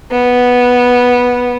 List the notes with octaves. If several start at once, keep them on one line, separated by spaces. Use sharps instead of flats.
B3